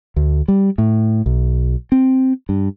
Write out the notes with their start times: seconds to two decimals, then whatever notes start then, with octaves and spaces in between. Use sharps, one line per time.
0.16 D2
0.48 G3
0.78 A2
1.26 B1
1.92 C4
2.49 G2